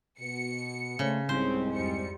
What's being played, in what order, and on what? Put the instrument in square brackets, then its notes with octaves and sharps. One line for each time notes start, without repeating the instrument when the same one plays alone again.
[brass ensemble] B2 [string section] C#7
[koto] C#3 [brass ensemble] A3 D4 C5
[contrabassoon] C2 [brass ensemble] G#2 G#3 [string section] C4 C#4 [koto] C5
[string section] F2 G3 C#7